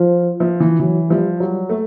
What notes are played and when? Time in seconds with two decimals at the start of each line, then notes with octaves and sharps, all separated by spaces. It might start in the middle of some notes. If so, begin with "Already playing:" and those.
Already playing: F3
0.40 F3
0.60 E3
0.80 E3 F#3
1.10 F3 G3
1.40 F#3 G3
1.69 A3